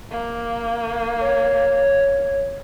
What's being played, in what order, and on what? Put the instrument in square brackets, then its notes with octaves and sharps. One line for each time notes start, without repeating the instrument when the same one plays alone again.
[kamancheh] A#3
[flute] C#5